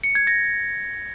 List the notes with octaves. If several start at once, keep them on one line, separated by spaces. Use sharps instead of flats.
C#7
G#6
A#6